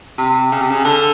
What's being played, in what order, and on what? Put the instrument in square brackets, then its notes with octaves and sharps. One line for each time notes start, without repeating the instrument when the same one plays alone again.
[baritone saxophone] C3
C#3
C3
C#3
D3